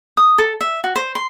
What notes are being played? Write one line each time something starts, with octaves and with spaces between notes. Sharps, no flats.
D#6
A4
E5
F#4
C5
C6